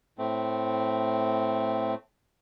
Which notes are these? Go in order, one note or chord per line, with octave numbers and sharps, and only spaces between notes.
A2 A3 C4